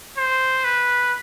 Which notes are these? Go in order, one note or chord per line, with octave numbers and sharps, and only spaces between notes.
C5
B4